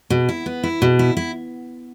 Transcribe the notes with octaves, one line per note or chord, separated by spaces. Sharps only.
B2
E4
B3
E4
B2
E4
E4